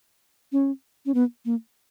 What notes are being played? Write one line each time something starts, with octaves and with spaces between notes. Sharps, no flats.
C#4
C#4
B3
A#3